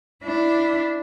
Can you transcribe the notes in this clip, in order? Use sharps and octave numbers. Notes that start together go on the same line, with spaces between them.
D4 E4